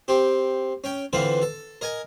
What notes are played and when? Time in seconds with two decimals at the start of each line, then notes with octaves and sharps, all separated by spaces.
0.08 C4 G4
0.84 C#4 G5
1.13 D3 E3 C4 F4 B4
1.42 A4
1.81 A#4 D#5 G#5